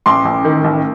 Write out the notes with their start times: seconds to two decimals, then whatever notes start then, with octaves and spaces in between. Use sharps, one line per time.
0.06 A1 C6 D6
0.25 A1
0.45 D#3
0.64 A1